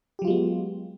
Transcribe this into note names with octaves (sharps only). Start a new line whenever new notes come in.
F#3 G#3 B3 F4 G4